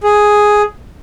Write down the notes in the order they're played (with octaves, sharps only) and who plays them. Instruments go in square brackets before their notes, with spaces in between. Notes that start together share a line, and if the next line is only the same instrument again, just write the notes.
[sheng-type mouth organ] G#4